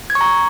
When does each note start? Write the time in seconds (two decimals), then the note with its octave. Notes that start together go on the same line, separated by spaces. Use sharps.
0.10 G#6
0.15 C#6
0.21 A#5